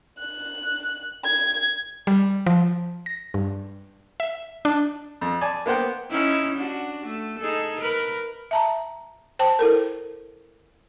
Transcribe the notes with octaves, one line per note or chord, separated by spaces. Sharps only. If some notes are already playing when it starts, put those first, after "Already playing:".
F#6
G#6
G3
F3
A#6
G2
E5
D4
F2
D5 G#5 A5
A#3 B3 C5 F#5 G5
C#4 D#4 E4
D4 F#4
A3
D#4 G#4 A4
A#4 B4
E5 A5 A#5
C5 G5 A5
E4 A4 A#4